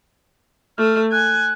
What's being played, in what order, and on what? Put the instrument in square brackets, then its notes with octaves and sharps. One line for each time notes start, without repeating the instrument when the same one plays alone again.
[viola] A3 [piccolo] F6
[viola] G#5 [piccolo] F#6